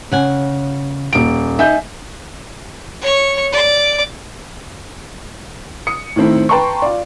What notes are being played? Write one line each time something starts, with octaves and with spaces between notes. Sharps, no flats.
C#3 F#5 G#5
D#1 D7
D#4 E5 G#5 G6
C#5 C#6
D5 D6
D#6 C#7
A2 D#3 A3 C4 E4
B4 G5 A5 A#5 C6 C#6
F4 D5